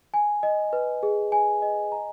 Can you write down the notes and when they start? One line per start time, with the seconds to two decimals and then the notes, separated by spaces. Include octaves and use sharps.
0.14 G#5
0.43 D#5
0.73 B4
1.03 G#4
1.32 G#5
1.62 D#5
1.92 A#5